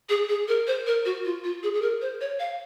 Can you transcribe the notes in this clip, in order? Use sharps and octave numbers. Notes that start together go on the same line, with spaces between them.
G#4
G#4
A#4
C5
A#4
F#4
F4
F4
G#4
G#4
A#4
C5
C#5
F5